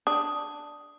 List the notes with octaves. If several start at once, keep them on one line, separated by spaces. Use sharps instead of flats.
D4 D#6